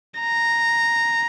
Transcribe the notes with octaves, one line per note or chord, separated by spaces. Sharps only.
A#5